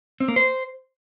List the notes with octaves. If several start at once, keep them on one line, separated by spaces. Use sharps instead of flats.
C4
A#3
C5